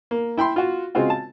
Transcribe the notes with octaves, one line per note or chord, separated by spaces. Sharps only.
A#3
E4 G5 B5 C6
F4 F#4
C#3 G#3 C4 F4 F#4
A5